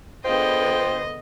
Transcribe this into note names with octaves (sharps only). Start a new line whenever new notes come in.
D3 B3 F4 G#4 C5 D#5 G5